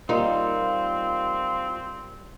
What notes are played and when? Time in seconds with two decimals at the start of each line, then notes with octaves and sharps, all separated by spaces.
0.09 G3 A#3 C4 D#4 F4